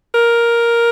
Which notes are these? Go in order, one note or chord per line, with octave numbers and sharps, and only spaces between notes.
A#4